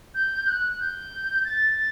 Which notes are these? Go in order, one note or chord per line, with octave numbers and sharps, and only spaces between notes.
G6
F#6
G6
A6